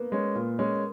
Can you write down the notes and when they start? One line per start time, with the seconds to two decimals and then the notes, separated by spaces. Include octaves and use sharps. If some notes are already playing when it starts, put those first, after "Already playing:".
Already playing: A#3 B3
0.12 G#3 C#4
0.35 A#2
0.59 G#3 C#4